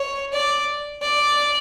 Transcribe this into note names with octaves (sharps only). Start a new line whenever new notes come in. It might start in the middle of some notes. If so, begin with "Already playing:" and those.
Already playing: C#5
D5
D5